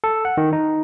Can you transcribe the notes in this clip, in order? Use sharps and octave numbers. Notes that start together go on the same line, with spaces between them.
A4
F#5
D#3
D#4